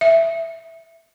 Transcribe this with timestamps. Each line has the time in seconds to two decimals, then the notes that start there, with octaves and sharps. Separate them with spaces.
0.01 E5